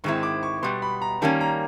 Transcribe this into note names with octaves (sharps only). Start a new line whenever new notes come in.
G#2 D#3 G#3 C4 E4 C#6
D6
C#6
B2 G3 B3 C6
B5
A#5
D#3 G3 A#3 C#4 A5
A#5